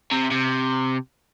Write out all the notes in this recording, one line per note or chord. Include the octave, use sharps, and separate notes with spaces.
C3
C3